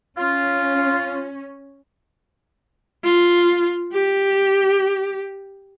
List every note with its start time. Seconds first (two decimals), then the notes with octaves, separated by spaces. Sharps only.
0.18 C#4 F4
3.04 F4
3.92 G4